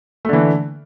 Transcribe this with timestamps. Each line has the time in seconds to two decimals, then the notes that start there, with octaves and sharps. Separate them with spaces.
0.25 A3
0.29 D3
0.33 E3